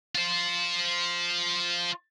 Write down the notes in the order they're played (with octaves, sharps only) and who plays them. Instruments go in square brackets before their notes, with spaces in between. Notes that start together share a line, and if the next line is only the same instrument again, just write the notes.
[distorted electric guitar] F4 C5